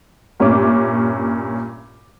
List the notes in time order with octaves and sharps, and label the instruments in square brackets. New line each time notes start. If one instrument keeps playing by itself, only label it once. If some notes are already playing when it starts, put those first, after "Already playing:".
[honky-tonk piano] G2 A#2 C#4 E5 D6